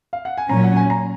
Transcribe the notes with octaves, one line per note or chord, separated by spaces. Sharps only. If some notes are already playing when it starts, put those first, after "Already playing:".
F5
F#5
G#5
A#2 F#3 C#4 A#5
F#5
G#5
A#5